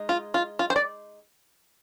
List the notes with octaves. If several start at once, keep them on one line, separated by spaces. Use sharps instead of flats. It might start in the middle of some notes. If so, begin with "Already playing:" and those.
Already playing: G#3 D#4
F4
F4
F4
C5
D5